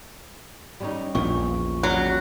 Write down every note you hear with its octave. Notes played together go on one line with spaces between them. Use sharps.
G3 C#4 D#4
A#1 E2 A#2 C#6
C#3 F#3 G3 F#6